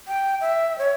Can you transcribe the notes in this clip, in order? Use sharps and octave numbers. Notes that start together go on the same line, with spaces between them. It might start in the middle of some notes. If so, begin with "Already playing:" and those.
G5
E5
C#5